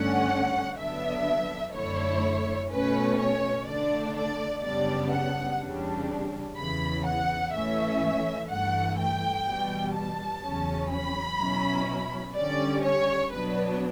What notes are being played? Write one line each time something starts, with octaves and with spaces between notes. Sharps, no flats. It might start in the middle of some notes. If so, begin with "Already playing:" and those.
Already playing: G2 D3 A3 C#4 F#5
D3 F#3 B3 D4 E5
F#2 D3 A3 E4 C#5
B2 A3 C#4 B4
C#5
D3 A3 D4 D5
D5
F#2 C#3 G3 B3 D4 D5
F#5
E2 C#3 G3 D4
E2 C#3 E3 B5
F#5
A2 E3 A3 C#4 E5
G2 E3 A3 F#5
G5
E2 B2 G3
A5
E2 C#3 F#3 C#4
B5
B2 F#3 C#4 E4
D3 G3 C#4 D5
C#5
B2 F#3 B3 D4 B4